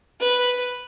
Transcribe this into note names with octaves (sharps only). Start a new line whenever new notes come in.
B4